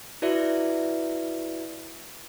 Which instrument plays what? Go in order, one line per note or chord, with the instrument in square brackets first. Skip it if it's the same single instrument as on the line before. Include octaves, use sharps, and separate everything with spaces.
[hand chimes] E4 F#4 B4 D5 E5